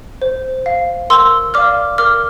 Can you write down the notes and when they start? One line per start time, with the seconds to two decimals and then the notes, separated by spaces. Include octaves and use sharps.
0.22 C5
0.66 F5
1.10 A#4 C6 E6
1.54 D5 F5 D6 F6
1.98 A#4 D6 F6